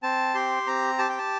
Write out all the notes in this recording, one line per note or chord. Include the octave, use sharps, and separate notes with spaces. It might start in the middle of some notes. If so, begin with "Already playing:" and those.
C4 A5
G4 C6
C4 A#5
G4 A5
G5
A5